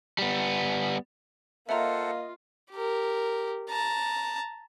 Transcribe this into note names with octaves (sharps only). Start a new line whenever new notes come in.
G3 B3
A#3 F4 A4 C5 D#5 E5 F#5 A#5
G4 A#4
A5 A#5